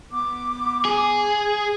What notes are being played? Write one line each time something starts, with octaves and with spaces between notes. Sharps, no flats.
B3 D6
G#4